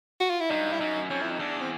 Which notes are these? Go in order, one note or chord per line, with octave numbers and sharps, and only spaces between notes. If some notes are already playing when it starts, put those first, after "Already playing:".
F#4
F4
E4
G2 D#4
E4
F#2 D#4
F2 C#4
E4
D#4
E2 D4
C4